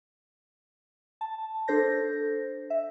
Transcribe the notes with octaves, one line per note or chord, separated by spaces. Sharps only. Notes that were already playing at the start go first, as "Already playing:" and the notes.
A5
D4 A4 C5 G6 A#6
E5